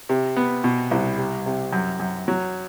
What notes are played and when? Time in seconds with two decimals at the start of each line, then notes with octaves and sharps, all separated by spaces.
0.09 C3
0.37 B3
0.64 B2
0.91 C2
1.18 C3
1.46 C3
1.73 F#2
2.00 F#2
2.28 F#3